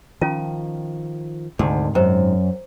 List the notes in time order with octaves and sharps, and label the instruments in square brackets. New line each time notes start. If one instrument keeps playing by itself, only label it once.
[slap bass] D#3 F3 [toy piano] C#4 F4 A5
[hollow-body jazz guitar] D2 [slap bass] G#2 C3 D#3
[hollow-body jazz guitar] F#2 [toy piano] C5 A#5